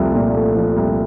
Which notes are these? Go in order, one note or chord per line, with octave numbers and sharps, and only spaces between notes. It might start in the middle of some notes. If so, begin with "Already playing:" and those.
Already playing: C2 F3 A3
A#2
A3
F3
C2